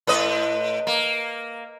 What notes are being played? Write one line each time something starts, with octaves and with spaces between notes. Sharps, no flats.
A2 B4 D#5
A#3